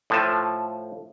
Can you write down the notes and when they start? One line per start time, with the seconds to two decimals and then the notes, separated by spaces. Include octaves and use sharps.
0.10 A2 F3 A5